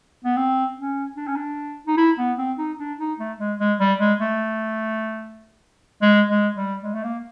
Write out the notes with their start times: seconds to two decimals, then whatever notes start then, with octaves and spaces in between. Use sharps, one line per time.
0.25 B3
0.37 C4
0.77 C#4
1.17 D4
1.27 C#4
1.36 D4
1.87 D#4
1.97 E4
2.19 B3
2.38 C4
2.58 D#4
2.79 D4
2.99 D#4
3.19 A3
3.40 G#3
3.60 G#3
3.80 G3
4.00 G#3
4.21 A3
6.02 G#3
6.29 G#3
6.56 G3
6.83 G#3
6.94 A3
7.04 A#3